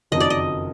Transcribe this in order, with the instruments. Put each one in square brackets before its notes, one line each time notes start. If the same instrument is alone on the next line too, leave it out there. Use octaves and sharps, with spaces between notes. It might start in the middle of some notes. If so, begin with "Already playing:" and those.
[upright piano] F#1 F2 D#3 F#3 [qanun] D#5
[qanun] D5
D#5